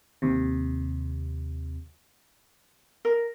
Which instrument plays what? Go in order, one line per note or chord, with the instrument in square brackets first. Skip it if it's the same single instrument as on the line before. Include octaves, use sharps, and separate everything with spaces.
[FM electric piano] D#2 C3
[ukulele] A#4